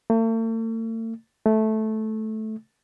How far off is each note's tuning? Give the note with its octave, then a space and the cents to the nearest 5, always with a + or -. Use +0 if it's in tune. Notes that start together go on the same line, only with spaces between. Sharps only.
A3 +45
A3 -10